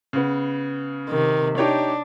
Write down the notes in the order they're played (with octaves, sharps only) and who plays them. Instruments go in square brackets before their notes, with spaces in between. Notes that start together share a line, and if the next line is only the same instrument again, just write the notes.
[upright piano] C#3 B3
[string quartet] C3 D#3
[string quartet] D4 [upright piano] D#4 G4 C#5